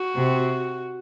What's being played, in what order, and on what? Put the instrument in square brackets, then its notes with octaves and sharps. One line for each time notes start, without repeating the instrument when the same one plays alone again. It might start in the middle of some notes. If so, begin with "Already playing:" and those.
Already playing: [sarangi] F#4
[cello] C3